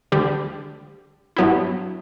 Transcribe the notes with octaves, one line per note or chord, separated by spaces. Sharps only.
D2 D3 G3
G2 F#3 B3 E4